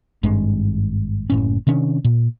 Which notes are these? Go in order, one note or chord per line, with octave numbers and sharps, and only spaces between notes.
G#1 G2 G#3
F#1 A2 C#4
C3 D#3 C#4 D4
A#2